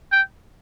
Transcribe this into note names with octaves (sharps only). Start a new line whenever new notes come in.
G5